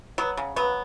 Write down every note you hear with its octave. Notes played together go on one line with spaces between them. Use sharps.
F#3 B3
C#3
F#3 B3